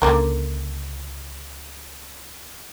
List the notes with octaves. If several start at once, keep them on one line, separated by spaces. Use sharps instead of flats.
C#2 D3 A#3 A#4